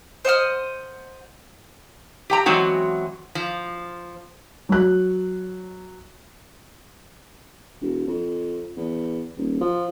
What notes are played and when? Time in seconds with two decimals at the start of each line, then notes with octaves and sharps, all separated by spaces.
0.25 C5 D#5 F#5 F6
2.30 G4 G5 A#5
2.46 E2 F#3 G#3 C4 F#4 G5
3.35 F3
4.69 F#3 F#6
7.81 E1
8.08 F2
8.77 E2
9.37 D#1
9.61 F3